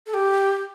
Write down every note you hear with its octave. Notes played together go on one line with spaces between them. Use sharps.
A4
G4